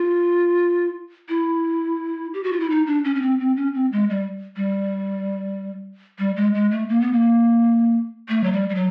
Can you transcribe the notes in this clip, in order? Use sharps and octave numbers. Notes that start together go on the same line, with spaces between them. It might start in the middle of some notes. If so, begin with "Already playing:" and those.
Already playing: F4
E4
G4
F#4
F4
E4
D#4
D4
C#4
C#4
C4
C4
C#4
C4
G#3
G3
G3
G3
G#3
G#3
A3
A#3
B3
A#3
A3
F#3
G3
G3
F#3